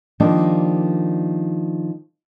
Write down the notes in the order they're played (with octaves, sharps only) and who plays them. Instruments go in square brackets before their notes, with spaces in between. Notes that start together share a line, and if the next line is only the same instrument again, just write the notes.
[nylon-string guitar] D#3 F3 G3 A#3 D4